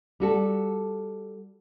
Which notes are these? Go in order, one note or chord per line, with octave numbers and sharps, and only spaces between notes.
G3 F#4 A4